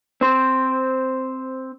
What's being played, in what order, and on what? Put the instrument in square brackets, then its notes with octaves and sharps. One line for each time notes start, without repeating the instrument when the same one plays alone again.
[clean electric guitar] C4 C5